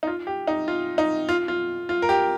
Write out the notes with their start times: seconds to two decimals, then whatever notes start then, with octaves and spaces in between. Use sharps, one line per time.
0.03 D#4
0.07 F4
0.27 G4
0.47 D#4
0.68 F4
0.98 D#4
1.29 F4
1.48 F4
1.89 F4
2.02 A#4
2.09 G4